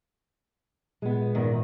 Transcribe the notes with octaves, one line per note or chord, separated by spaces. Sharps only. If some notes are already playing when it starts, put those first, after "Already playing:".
A#2 G#3 B3
E2 G#2 D#3